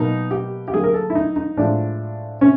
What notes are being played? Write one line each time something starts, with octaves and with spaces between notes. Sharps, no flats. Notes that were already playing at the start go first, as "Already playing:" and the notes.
Already playing: B2 F#3 A#3 D#4
G4
G4
D3 F#3 A#3 G#4
A#4
A4
E4
D#4
D#4
A2 F3 G#3 D4
C3 C#4